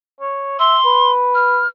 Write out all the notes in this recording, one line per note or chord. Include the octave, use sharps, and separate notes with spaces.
C#5
E5 C6
B4
F6